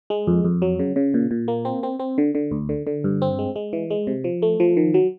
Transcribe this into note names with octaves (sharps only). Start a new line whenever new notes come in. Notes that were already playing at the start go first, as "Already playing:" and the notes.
G#3
F2
F2
F#3
C#3
C#3
A#2
A#2
A#3
C4
C4
C4
D3
D3
D2
D3
D3
G2
C4
G#3
G#3
E3
G#3
C3
F3
A3
F3
D#3
F#3